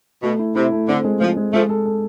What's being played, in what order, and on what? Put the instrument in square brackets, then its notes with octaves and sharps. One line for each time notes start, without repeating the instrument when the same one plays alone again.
[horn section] B2 [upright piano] A3
[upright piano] E4
[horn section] C3 [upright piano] E4
[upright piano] A3
[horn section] D3 [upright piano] C4
[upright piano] G#3
[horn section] F3 [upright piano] G#3
[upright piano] G#3
[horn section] F3 A3 [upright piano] G#3
[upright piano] A4
A4